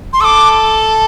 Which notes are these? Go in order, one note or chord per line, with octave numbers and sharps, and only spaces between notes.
C6
A4 D6 E6